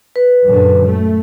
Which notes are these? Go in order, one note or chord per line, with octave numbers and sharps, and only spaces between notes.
B4
F#2 A#2 D3
A3